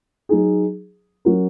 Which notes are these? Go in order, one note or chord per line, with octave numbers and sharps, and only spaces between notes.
F#3 D#4 G#4
F#3 C#4 F#4 A#4